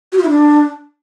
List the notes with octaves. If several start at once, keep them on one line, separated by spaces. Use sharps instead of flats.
F#4
F4
E4
D4